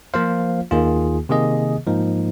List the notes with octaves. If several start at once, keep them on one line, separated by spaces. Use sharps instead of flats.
F3 A#3 F4 C5 F5
D#2 D#3 A#3 F4 G#4
C3 D#3 A#3 G#4 D#5
G#2 F3 A#3 D#4